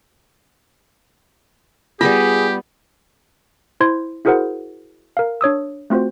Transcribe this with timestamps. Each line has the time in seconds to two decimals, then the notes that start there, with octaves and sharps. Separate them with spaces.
2.01 G3 B3 F4 G4 G#4 B5
3.80 E4 C5 C6 G#6
4.25 E4 F#4 G#4 A#4 C5 F#5
5.17 A#4 F5
5.41 D4 C#5 D#6 E6
5.90 A3 C4 F4 F#4 C5